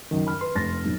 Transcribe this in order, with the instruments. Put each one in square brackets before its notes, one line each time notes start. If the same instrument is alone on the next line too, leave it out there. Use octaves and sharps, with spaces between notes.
[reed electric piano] C#2 F#2 D#3
[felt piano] B5 F6
[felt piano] B4 [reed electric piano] C6
[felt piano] F1 A6 A#6
B1 B2